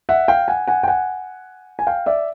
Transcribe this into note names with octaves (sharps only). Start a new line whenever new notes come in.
E5 F#5
F5 G5
F#5 G#5
F#5 G#5
G5
F#5 G#5
G#5
F5 G5
D5 E5